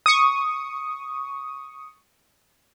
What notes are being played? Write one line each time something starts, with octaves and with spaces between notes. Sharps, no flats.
C#6 D#6